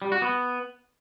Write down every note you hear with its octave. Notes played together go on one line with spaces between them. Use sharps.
G3
F#4
B3